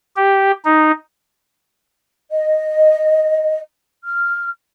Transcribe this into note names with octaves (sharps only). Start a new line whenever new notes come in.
G4
D#4
D#5
F6